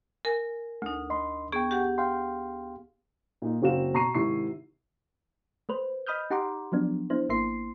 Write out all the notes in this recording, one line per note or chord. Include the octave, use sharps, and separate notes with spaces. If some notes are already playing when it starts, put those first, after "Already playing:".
A#4 G#5
D2 A3 D#4
D#5 B5 C6
B3 G#4 G5 C#6
G4 F#5
F5 G5 C6
A#2 D#4
F#1 C4 F#4 F5 E7
B2 A#5 C#6 C7 D#7
G#2 C3 D#3 E4 C#6 C7
A3 B4 C5
D#5 B5 D#6 F6 G6
D#4 G4 F#5 A#5 C6 D6
F3 F#3 B3 D4
B3 D4 E4 C5
G#1 A#3 E4 C6 C7